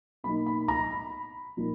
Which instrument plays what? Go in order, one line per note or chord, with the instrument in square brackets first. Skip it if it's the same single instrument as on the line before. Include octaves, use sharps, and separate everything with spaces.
[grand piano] B2 F#3 A#3 D#4 B5
B5
A#5
B5
A#2 F3 A#3 D#4